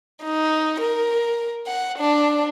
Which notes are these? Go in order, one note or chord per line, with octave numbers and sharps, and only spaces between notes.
D#4
A#4
F#5
D4